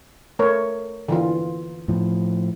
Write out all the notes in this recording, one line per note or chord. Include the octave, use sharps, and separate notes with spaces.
A3 A#4 C#5
D3 E3 F4
A2 F3